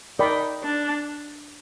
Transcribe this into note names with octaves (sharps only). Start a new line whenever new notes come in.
D#4 A#4 D5 G5 B5
D4